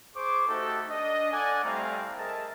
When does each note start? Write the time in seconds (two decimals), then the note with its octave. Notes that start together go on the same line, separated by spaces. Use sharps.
0.16 G#4 C5 C#6 D6
0.48 A3 D#4 F#4 G4 A4
0.90 D4 D#5
1.32 A4 D5 F#5 G#5
1.65 G3 A3 C4 E4 F5 A#5
2.18 G#4 A#4 D#5 E5 A5